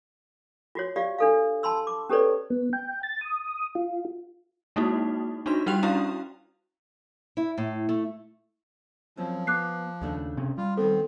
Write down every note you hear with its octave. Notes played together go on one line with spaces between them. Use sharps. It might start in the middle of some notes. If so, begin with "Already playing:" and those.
F4 F#4 C#5
F4 G4 D5 F5
D4 A4 F5
A5 B5 C6 E6
D6
C#4 G4 A4 B4 C#5 D5
B3
G5
A6
D#6
F4
G#3 A#3 D#4 E4 F#4
D4 D#4 F4 F#4 C6
G3 F#4 G4 G5 F7
C#4 D4 E4 F#4 F5 A#5
E4
A2
A3
F#2 F3 C4 C#4
B3 D6 F#6 C7
D#2 C#3 A3 D4
C3 C4 C#4
G3 F4
D#3 B3 C4 A4